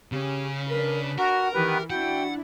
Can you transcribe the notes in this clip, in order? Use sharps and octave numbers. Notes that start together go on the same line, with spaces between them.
C#3 C#4 G4
D4 A#4 B4
F#4 A#4 F#5
D#3 E3 B3 G4 B4
D4 E4 F#4 F#5 G5